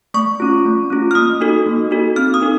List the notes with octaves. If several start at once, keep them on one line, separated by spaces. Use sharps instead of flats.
A3 C#6
C#4 F4
A3
C#4 F4
F6
A#3 D#6
D#4 F#4 A4
A#3
D#4 F#4 A4
C4 F6
D#6
D#4 A4